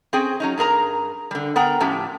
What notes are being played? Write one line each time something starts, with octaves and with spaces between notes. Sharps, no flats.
C4 C#4 G#4 G5 G#5
F#3 C#4 D#4
G2 G#4 A#4 A#5
D3 G3
B3 A#4 F#5 G5 A#5
A2 F3 C#4 G4